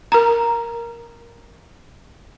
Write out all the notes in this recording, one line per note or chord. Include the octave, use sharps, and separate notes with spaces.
A#4 A#5